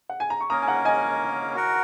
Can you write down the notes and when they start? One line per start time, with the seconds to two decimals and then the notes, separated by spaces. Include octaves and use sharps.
0.09 F#5
0.20 G#5
0.30 A#5
0.40 C#6
0.50 A#3 C#4 A#4 A#5 D#6
0.62 G#5
0.68 F#5 A#5
0.85 D#5 G#5
1.55 F#4 A#4 F#5